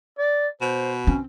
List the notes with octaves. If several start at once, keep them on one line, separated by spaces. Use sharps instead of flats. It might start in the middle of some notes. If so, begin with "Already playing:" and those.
D5
B2 C5
C4 C#4